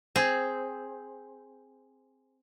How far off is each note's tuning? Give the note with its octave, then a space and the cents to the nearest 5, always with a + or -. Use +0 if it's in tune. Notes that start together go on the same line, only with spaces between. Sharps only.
C4 +0 G#4 +5